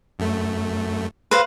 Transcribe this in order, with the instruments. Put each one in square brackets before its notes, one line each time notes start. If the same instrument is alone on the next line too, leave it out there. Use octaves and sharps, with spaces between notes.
[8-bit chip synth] F#2 A3
[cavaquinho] B4 C5 F5